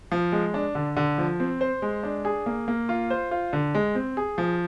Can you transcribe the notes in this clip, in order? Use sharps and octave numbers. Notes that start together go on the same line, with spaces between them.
F3
G#3
D4
D3
D3
F3
C4
C5
G#3
D4
G#4
A#3
A#3
F4
C5
F4
D3
G#3
C4
G#4
F3